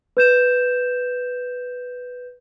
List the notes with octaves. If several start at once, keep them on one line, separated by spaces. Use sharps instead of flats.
B4 G6 E7